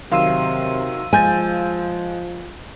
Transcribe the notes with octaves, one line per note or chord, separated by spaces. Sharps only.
C3 D#3 F#3 F5 C6 E6 D#7
F3 G#3 G#5 G6 A6